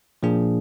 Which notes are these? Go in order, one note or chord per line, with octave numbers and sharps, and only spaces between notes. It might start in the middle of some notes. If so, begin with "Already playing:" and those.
A#2 F3 A#3 D4 G#4